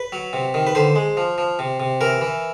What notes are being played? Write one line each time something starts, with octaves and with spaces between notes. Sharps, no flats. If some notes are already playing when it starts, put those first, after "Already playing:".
Already playing: B4
F#3
C3
D#3
B4
D3 C5
G#3
F3
F3
C3
C3
E3 A#4
E3